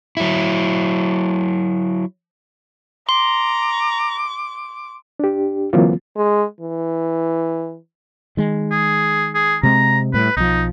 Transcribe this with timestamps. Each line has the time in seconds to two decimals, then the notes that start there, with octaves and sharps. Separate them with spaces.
0.17 F#3 E4
3.09 A#5 C6 D6
5.20 D4 G4
5.73 D3 E3 F#3 A#3 C4 F4
6.16 G#3
6.61 E3
8.37 D#3 G#3
8.71 G#4
9.35 G#4
9.63 C3 G#3 C4 A#5
10.14 A2 G3 B4
10.37 B1 F3 D#4